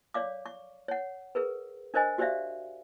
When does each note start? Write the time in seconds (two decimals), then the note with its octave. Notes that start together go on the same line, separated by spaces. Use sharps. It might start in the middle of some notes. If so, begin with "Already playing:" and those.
0.14 C#5 D5 F5 D6
0.46 C#6
0.88 C#5 F#5
1.35 G#4 A#4 B4
1.94 D4 A#4 C5 D#5 G#5
2.18 F#4 G4 C5 D5 E5 F5